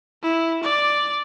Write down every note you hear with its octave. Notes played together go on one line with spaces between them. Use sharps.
E4
D5